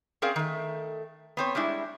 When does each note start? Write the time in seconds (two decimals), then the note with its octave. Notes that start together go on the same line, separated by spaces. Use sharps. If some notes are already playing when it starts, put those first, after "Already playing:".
0.22 C4 C#4 G#4 A#4 D5 F5
0.36 D#3 A3
1.37 B3 C4 C#5
1.55 G3 G#3 D4 E4